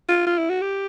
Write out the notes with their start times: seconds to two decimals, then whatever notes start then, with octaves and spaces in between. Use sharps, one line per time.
0.09 F4
0.27 F4
0.38 E4
0.50 F#4
0.62 G4